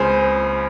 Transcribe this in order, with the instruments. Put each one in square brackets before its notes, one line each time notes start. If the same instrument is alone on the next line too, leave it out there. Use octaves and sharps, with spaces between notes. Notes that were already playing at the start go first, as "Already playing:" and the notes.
Already playing: [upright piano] C#2 C#3 C5 G#5